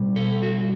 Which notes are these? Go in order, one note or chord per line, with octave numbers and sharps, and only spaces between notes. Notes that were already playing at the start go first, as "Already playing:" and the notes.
Already playing: B2 G3
A4
F#4